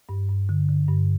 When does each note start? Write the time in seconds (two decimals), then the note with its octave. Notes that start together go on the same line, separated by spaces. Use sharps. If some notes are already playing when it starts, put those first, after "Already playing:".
0.09 G2
0.29 G2
0.49 D3
0.69 D3
0.88 G2